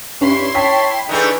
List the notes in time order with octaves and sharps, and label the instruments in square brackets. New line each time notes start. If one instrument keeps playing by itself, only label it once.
[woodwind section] G2 [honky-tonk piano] C#4 [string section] E4 C6
[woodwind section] C#5 A5 [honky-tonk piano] G5 B6
[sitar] D3 A3 G#4 [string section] E3 [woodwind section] D#4